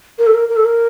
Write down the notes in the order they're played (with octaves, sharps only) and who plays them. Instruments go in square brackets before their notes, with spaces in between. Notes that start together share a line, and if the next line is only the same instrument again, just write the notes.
[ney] A#4
A4
A#4
A#4
A4
A#4